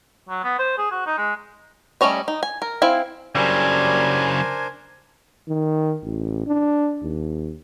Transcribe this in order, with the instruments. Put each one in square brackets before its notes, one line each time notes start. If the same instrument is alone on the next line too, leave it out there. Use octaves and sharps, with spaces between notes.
[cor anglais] F#3
B3
C5
G#4
F#4
D#4
G#3
[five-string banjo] G3 A3 C#4 C#5 D#5
D#4
G#5
A#4
C4 E4 F5 G#5
[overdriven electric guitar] C#3 F#3 [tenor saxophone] G3 [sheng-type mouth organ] D4 A#4 C5 [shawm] G#5
[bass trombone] D#3
A1
D4
D#2